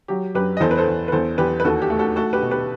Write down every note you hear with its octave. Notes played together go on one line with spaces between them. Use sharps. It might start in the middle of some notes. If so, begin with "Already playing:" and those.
F#3 G4
F#2 G4 B4
D#5
E2 A4 C5
B4
A4 C5
E2
B4
E2 A4 C5
E2 G4 B4
B4
D#2 F#4 A4
G4
A3
F#4 A4
A3 F#4 A4
G4 B4
B2
G4 B4